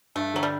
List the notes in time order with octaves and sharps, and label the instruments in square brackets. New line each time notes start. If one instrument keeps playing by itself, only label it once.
[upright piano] G2 [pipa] A3
[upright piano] D3 [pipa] F#3
[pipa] G3